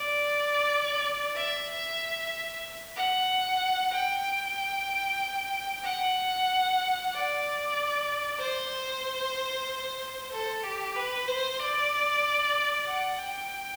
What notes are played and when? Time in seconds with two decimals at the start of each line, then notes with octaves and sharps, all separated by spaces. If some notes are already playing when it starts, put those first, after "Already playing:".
Already playing: D5
1.36 E5
2.96 F#5
3.92 G5
5.83 F#5
7.12 D5
8.40 C5
10.31 A4
10.63 G4
10.95 B4
11.27 C5
11.59 D5
12.88 F#5
13.18 G5